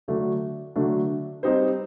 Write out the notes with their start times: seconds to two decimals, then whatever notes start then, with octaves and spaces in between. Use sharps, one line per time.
0.08 D3 F#3 A3 D4
0.76 D3 F#3 A3 D4
1.43 G3 C4 D#4 G4 C5